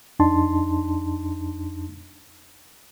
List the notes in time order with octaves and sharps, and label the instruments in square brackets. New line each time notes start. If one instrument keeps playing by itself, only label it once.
[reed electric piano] F2 D4 D#4 A5 C6